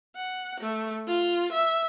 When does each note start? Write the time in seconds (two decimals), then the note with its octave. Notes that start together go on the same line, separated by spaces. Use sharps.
0.16 F#5
0.60 A3
1.08 F4
1.52 E5